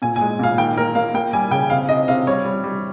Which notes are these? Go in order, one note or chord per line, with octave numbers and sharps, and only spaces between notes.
A#2 G#5
G#5
G#3
A#2 F5
D#3 G5
A#3 A#4
A#3 F5
A#3 G5
G3 G#5
C#3 G5
C3 F5
C3 D#5
C3 F5
G3 C#5
G3
G3